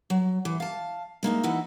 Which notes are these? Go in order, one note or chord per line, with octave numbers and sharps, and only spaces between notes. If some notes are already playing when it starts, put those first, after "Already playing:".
F#3
E3
F5 A5
G#3 A#3 D#4 E5
E3 D#4 E4 F#5